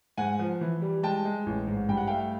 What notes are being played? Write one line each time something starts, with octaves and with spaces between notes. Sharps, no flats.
G#2 F#5 G#5
F3
E3
G3
G#3 G5 A5
G#3
A1
G#2
G2 G5
F#5
A3 F5 G5